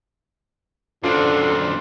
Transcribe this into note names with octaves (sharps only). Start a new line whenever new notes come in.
F#2 D3 C4 D4 F4